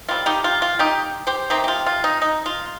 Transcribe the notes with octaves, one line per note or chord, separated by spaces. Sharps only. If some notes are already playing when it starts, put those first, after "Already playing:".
D#3 G3 C4 F4
D#4 G4
F4
F4
D#4 G4
G4 C5
C3 D#3 C4 D#4 G4
G4
F4
F4
D#4
D#4
F4